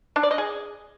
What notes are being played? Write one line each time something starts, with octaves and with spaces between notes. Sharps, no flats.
D4
D5
D#5
G#4